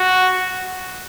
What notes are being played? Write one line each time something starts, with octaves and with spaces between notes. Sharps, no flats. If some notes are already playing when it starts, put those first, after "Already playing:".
Already playing: F#4